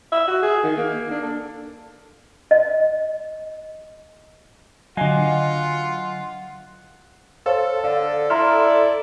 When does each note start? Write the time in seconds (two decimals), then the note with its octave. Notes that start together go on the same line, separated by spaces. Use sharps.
0.12 E5
0.28 F#4
0.42 G#4
0.63 D#3
0.77 A#3
1.10 D4
1.23 A4
2.51 D#5
4.97 D3 F#3 F4 D#5 F5 F#5 G#5
7.46 A4 C5 C#5 F5
7.84 D3 F5
8.30 E4 D5 A#5 C6 F6